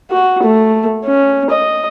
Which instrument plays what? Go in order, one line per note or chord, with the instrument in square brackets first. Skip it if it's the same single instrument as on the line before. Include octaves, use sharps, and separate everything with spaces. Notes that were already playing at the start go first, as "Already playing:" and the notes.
[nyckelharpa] F#4
A3
C#4
D#5